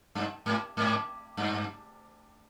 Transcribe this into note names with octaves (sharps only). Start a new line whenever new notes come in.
G2
G#2
G#2
G2